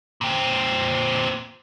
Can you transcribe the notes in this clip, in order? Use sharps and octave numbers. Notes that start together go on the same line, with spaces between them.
A#2 C4